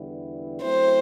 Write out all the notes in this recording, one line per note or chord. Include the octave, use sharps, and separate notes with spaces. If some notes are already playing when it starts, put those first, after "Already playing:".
Already playing: E2 D3 G3 B3 E4
F#3 A3 C4 E4 C5